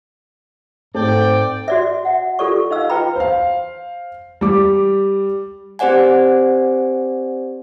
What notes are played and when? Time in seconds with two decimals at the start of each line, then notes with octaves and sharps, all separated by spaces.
0.94 G#2 A3 C4 A4 D5 G5
1.68 F#4 D5 E5
2.05 E5 F#5
2.39 F4 G4 A4 A#4 D5 C#6
2.71 D#4 D#5 F5 E6
2.90 F4 B4 G5 A#5 B5
3.16 C5 F5
4.41 G3 D6
5.79 C4 G4 C5 D5 F#5 G#5